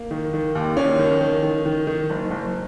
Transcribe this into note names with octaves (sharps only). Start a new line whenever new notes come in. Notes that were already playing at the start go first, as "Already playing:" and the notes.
Already playing: A#3
D#3
D#3
D#2
D#2 C#4
D#3
D#3
D#3
D#3
D#3
F#1
F#1